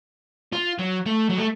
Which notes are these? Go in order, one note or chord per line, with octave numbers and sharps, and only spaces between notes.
F4
F#3
A3
F#3
A3